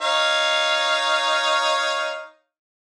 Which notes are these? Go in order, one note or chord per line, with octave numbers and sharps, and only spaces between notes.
D#4 C#5 F5